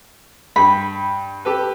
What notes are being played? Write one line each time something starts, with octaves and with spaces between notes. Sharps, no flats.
G2 B5
G4 A4 B4